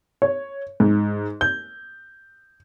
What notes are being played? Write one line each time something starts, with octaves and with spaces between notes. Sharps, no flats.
C#5
G#2
G6